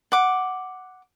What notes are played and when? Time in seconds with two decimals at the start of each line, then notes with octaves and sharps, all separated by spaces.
0.12 F#5 D6